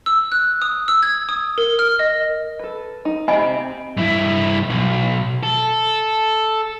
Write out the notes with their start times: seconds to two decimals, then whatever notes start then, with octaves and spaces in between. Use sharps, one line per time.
0.06 E6
0.32 F#6
0.62 D#6
0.88 E6
1.03 G#6
1.29 D#6
1.58 A#4
1.79 F6
1.99 D#5
2.59 A4 B4
3.05 D#4
3.28 C4 G4 D#5 G#5 B5
3.97 G2 E4
4.70 B1
5.43 A4